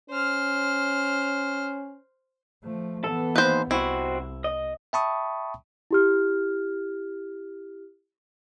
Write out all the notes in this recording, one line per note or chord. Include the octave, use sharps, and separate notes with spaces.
C#4 C5 F6
F3 A3
E3 B3 A4
D#2 B4 C5
C2 C4 E4 F#4
D#5
E5 G5 A5 B5 C#6 D#6
E4 G4 F6